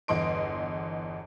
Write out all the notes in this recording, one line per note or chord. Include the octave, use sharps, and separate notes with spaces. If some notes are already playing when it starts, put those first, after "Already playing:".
G1 E2 D#5 C6 D7